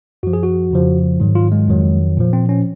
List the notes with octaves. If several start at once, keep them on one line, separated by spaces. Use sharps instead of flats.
F#2 F3 F#4
G#4
F#4
F2 C#3 F3
G#2 D#3 F#3
F4
G#3
F2 D#3 F#3
A#2 F3
C4
C#4